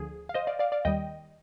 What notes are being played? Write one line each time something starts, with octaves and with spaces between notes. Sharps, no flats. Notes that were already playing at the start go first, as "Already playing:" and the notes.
Already playing: D2 D3 F3 G#4
F5
C5 D#5
D5 F5
D5 F5
D5 F5
D#2 D#3 G3 D#5 G5